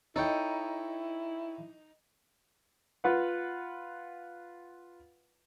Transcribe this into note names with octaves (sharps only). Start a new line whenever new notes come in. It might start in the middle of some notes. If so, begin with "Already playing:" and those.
D#4 E4 A4 C#5 G5
F4 B4 F#5